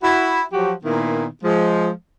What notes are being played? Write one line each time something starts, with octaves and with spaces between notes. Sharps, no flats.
E4 F#4
F3 F#3 F#4 G4
A#2 D#3 A#3 B3 E4
F3 G#3